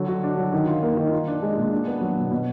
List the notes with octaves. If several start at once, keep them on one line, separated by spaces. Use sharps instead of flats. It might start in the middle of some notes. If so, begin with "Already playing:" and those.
Already playing: D3 F#3
F#4
D4
F#3
D#3
F4
A#3
D#3
F4
D4
G#3
A#2
D4
B3
F#3
B2
B2